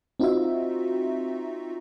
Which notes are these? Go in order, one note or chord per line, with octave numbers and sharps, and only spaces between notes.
C4 D#4 F4 F#4 E5